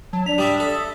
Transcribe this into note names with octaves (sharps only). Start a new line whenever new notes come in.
F#3 A5
D4 B6 F7
G3 D5 E5 D#6
A4 D#6
E5